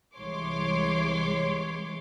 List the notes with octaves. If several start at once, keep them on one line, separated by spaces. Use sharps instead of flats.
C2 E3 G#3 C#5 C6 D6